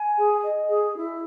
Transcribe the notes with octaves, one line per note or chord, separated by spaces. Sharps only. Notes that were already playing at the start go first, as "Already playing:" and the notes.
Already playing: G#5
G#4
D#5
G#4
E4